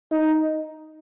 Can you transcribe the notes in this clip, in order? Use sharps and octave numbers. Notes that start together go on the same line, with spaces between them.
D#4